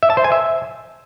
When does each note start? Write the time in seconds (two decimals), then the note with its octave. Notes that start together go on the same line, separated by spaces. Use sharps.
0.03 E5
0.10 A5
0.17 C5
0.24 G#5
0.32 E5